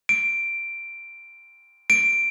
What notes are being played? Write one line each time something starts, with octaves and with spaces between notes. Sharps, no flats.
D7
D7